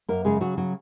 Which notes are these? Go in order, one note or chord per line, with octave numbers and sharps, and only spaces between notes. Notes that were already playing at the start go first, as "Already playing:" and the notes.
F#2 A#3 A#4
C#3 G#3 G#4
C#3 F#3 F#4
F#3 F#4